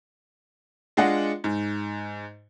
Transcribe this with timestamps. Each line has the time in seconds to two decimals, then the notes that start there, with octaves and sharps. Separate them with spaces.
0.97 G#3 D4 F4 D5 D#5 F#5
1.44 G#2